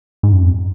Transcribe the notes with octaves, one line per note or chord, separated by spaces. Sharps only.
G#2
F#2
F2